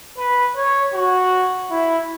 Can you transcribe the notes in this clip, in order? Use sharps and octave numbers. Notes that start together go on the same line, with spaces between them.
B4
C#5
F#4
E4